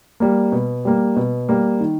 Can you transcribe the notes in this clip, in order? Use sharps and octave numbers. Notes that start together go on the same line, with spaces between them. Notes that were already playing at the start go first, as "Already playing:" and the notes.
G3 A#3
B2
G3 A#3
B2
G3 A#3
D#3